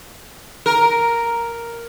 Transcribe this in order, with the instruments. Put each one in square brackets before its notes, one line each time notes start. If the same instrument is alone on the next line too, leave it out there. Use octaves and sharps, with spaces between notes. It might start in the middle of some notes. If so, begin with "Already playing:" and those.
[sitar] A#4